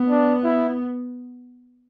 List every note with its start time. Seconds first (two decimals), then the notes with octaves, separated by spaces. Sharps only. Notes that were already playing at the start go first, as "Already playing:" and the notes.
Already playing: B3
0.10 D4
0.43 E4